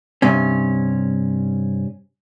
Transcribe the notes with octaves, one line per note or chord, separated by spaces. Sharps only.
G2 C3 C#4